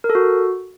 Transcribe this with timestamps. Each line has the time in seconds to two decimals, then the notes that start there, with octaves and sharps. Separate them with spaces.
0.04 A#4
0.10 A4
0.15 F#4